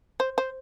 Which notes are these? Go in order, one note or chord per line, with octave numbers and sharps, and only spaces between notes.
C5
C5